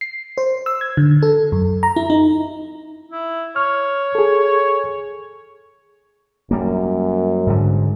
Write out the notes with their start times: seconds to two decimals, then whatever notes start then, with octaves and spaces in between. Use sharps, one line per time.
0.01 C7
0.38 C5
0.66 E6
0.81 G#6
0.97 D3
1.23 A4
1.52 F#2
1.83 A#5
1.96 E4
2.10 D#4
3.12 E4
3.56 C#5 F6
4.15 G#4 A4
6.51 F#2 G3 A#3
7.47 G#2 D3